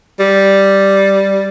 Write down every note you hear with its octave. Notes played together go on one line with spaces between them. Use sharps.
G3